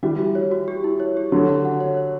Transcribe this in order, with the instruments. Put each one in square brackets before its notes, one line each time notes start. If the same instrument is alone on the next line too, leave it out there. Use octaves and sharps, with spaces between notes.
[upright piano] E3 G3 [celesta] F#4
[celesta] F#4
C#5
F#4
G4
E4
C#5
G4
[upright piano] D3 F#3 [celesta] C#5
[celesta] F#5
F#5
C#5
C#5